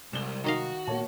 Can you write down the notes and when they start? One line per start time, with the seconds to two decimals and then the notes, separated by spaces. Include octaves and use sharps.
0.13 C2 C3 G3 G#3 E7 G7
0.44 D#3 F#4 D#5 F5
0.87 A#2 A#3 B3 C#5 A5